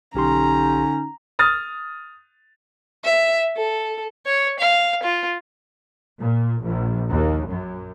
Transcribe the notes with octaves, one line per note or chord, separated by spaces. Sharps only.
B1 D3 C#4 D#4 G4 A#5 C6
D#6 F6 A6
E5
A4
C#5
F5
F4
A#2
A#1
D#2
F#2